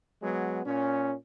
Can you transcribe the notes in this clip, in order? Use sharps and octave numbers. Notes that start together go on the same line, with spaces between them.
F#3 G#3 B3
A#2 C#4